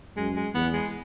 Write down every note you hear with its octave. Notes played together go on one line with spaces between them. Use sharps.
F#2 G#3
G#3
E2 B3
G#3